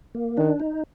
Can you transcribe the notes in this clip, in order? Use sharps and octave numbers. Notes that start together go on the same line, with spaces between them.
A#3
D#3 D4
D#4